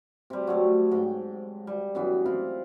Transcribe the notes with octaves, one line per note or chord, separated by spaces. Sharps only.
C3 G3
F#3 G3 A3
G#2 G5
G3
F#2 E3 B3
C4 E4 F4